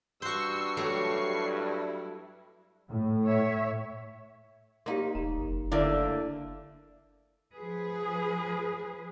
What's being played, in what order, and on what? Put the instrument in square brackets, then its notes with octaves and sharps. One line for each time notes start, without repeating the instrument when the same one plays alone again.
[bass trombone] G2 [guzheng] F#4 C5 [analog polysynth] C#6 C7 [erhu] E6
[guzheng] F#3 A3 [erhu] G4
[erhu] E4
[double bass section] A2
[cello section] C#5 E5
[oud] A#3 D#4 [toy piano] G4 F5 C6
[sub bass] E1 [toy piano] A#5
[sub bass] F#1
[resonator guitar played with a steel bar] D3 A3 A#3 [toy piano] E4 E5 G#5 [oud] D5
[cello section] F3 G#4 B4